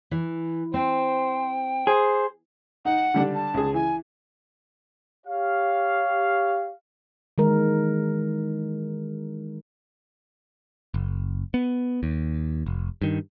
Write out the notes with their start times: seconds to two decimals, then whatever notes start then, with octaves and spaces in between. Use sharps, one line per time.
0.11 E3
0.74 C4 C5 G5
1.87 G#4 C5
2.85 D#4 F#5
3.14 D3 G3 D4
3.35 A5
3.54 C#2 G#4
3.74 E3 G#5
5.27 G4 C#5 F5
7.38 D#3 E3 G#3 A#4
10.94 F#1
11.54 B3
12.03 D#2
12.66 F1
13.02 G2 D#3